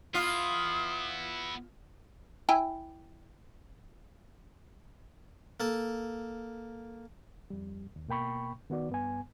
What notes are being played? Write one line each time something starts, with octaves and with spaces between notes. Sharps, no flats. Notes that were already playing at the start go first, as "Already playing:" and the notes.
B3 E4 F4 F5 D#6
E4 G5 G#5
A#3 A4 A5
F2 G3
D#2
B2 A#3 G5 B5 C#6
D#3 B3 F#4 D5
G2 B3 G#5